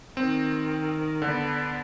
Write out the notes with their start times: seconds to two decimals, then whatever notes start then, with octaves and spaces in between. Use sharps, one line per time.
0.17 D#3 C4
1.22 D3 B3 D4